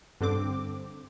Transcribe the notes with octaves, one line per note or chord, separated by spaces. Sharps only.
G2 D3 C4 D6